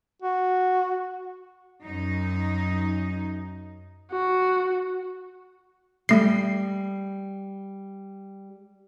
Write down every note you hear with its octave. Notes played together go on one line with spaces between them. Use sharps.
F#4
F#2 D#4
F#4
G3 A3 C7